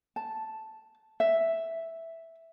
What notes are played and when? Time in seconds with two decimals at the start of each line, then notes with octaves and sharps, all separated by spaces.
0.16 A5
1.20 E5